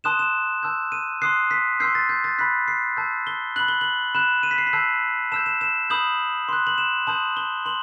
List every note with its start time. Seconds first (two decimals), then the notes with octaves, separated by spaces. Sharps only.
0.04 A5 C6 D#6 F#6 E7
0.19 E7
0.63 A5 E6 G6
0.92 D#7
1.22 C6 D#6 F#6 C7
1.51 B6
1.80 C6 E6 G6 C7
1.95 A6
2.09 G6
2.24 A6
2.39 B5 F#6 B6
2.68 C7
2.97 A5 E6 G6
3.27 G7
3.56 B5 F#6 F#7
3.68 G7
3.81 F#7
4.15 B5 F#6 E7
4.43 D#7
4.51 B6
4.58 C7
4.67 B6
4.73 A5 E6 G6 C7
5.32 A5 E6 G6 E7
5.46 E7
5.61 E7
5.90 B5 D#6 G6 F#7
6.49 C6 F#6
6.67 F#7
6.78 E7
7.07 A5 C6 D#6 G6 F#7
7.37 G7
7.65 C6 F#7